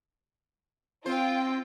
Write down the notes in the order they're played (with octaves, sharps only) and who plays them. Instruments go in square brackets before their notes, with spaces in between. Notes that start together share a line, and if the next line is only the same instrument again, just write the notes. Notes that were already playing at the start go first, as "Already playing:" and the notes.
[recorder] C4 [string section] F4 G5 [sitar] C5